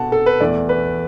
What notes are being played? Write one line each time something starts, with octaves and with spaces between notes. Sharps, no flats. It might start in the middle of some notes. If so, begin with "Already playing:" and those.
Already playing: B2 A3 F#5 A5
A4
B4
E2 E3 A3 D5
B4